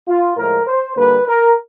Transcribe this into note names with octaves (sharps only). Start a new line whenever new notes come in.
F4
A2 F3 G#3 A#4
C5
D3 G3 A#3 B4
A#4